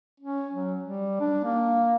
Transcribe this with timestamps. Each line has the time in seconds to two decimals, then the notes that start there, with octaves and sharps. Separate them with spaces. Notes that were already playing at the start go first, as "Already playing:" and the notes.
0.20 C#4
0.53 F#3
0.83 G3
1.20 D4
1.44 A#3